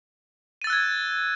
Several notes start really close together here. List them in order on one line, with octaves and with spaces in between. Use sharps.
D#7 A6 E6 F#6 G#6